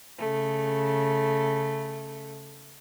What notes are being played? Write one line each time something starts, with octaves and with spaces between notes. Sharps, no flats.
C#3 A3